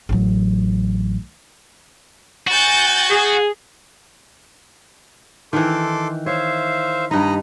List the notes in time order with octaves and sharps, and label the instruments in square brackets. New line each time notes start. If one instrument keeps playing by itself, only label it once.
[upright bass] A1 F#3
[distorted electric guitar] F#4 [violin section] G#5 G6 A6
[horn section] G#4
[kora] D#3 E3 [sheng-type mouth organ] A4 C6 D6
[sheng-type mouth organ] C5 E5 F5 [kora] C#5
[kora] G2 D#4 [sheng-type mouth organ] D#5 A#5 B5